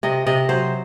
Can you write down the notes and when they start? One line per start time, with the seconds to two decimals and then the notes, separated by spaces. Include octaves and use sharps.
0.03 C3 D#5
0.26 C3 D#5
0.49 F#3 C5